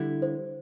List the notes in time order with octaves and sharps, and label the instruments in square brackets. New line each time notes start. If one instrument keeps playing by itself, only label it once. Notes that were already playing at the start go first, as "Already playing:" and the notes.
Already playing: [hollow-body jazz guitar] D3 G3 E4 [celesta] A4
[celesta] C5